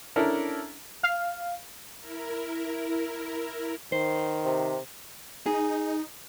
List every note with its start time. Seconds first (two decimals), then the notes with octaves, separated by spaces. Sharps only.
0.16 C#4 D4 E4 A4 A#4
1.03 F5
1.99 E4 A#4
3.92 D#3 C5
4.45 C3
5.46 D#4 G#4